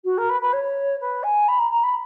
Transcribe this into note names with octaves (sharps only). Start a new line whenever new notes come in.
F#4
A#4
B4
B4
C#5
B4
G#5
B5
A#5
A#5
B5